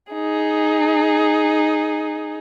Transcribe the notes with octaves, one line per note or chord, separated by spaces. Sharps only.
D#4 G#4